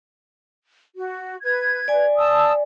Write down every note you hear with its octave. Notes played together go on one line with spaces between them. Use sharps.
F#4
B4 G#6
D5 G#5
A5 D#6 E6